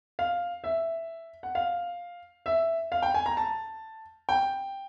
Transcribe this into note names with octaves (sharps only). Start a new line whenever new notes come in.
F5
E5
F#5
F5
E5
F5
G5
G#5
A#5
A5
G5